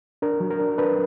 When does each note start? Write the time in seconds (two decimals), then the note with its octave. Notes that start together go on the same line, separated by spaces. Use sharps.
0.22 D4 A#4
0.40 F#3
0.50 A#4
0.60 D4
0.78 D4 B4